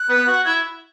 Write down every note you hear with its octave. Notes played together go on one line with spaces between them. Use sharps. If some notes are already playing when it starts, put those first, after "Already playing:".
Already playing: F#6
B3 B4
F#4 F#5
E4 E5 G#6